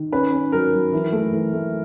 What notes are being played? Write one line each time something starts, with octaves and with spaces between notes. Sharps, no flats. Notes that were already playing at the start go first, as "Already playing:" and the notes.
Already playing: D#3
C#4 B4
C#4
F#3 A#4
F#3
E3
A3
E3
A3